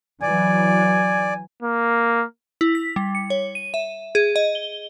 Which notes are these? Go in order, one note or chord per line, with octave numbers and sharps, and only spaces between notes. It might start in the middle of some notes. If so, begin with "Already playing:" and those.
E3 F#3 D5 G#5
A#3
E4
B6
G3
C#7
C#5
D#7
E5
G#4
D#5
G7